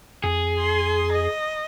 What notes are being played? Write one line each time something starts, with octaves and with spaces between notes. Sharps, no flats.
F2 G#4
C6
D#5